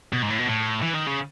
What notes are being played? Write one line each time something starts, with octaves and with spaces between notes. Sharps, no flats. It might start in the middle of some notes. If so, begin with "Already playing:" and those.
B2
G#2
A2
B2
A2
E3
D#3
C#3